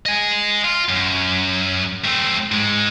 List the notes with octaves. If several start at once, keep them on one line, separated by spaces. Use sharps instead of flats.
D#5 G#5
F4
F#2
A3 C4
G#2 G#3